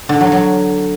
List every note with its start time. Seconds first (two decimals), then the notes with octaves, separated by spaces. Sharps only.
0.09 D3
0.21 F#3
0.32 F#3